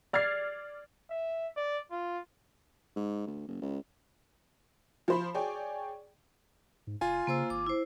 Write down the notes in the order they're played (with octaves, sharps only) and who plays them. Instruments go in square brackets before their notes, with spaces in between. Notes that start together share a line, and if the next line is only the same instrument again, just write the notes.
[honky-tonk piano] D5 F6 G#6 A6 C7
[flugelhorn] E5
D5
F4
[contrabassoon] G#2
D2
F#1
C#2
[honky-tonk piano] F3 C5 B5
G#4 C#5 D5 G5
[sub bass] G#2
[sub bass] F#1 [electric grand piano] F4 G#5
[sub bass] C#3 [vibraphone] A#3 C5 E6
[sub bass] G#1 [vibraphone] D6
[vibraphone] E4 C5